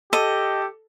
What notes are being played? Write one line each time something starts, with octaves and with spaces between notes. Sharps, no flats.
G4 A4 D#5